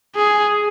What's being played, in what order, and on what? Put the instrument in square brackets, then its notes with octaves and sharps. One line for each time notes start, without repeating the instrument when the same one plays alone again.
[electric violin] G#4